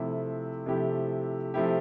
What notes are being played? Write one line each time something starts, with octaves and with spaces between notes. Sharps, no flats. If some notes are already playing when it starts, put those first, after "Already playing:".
Already playing: C3 F3 A3 E4 G4
C3 F3 A3 E4 G4
C3 F3 A3 E4 G4